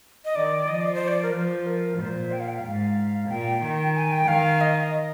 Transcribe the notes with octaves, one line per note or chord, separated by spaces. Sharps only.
D#5
D#3 D5
F3 D#5
D5
C5
D5
A#4
F3 C5
A#4
A#2 C5
G5
F5
G5
F5
G#2
A#2 G5
D#3
G#5
G5
D#3 F5
D#5